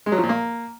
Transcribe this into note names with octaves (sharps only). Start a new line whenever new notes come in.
G#3
F#3
F3
A#2
A#3